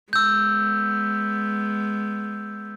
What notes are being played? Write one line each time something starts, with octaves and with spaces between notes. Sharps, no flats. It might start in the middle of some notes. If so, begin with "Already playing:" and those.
G#3 B3 E6 G6